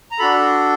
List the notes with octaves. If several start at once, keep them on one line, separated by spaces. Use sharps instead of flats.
A#5
D4 F#4 A4 B5